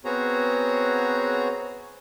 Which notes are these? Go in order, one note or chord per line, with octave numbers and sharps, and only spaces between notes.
B3 C4 F#4 G#4 C#5 A#5